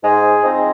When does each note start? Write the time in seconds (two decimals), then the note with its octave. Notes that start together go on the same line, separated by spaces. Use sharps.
0.03 G#2 G#4
0.42 F3 G#3 C4 D#4